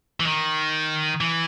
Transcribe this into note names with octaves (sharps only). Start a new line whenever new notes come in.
E3
D#3
E3